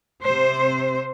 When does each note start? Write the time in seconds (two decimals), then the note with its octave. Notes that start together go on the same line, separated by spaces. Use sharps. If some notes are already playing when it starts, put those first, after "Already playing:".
0.24 C3 C5